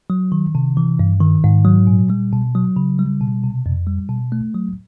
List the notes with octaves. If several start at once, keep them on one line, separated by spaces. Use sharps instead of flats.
F#3
D#3
C3
E3
G2
D#3
G#2
F#3
A#2
G3
B2
F#3
C#3
G3
B2
C3
F2
G3
B2
A3
F#3